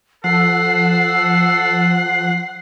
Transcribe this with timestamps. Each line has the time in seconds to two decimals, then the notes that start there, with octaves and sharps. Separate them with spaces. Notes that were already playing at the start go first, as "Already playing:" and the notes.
0.24 F3 A4 F#5 C7